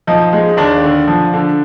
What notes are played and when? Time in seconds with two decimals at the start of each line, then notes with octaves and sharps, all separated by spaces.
0.07 F3 D#4
0.33 G#3
0.57 D#2 D4
0.83 D3
1.08 F3
1.34 D3